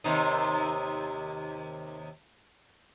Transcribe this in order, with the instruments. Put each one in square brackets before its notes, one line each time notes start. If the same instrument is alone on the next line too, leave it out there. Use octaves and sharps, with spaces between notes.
[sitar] D#2 C3 D#4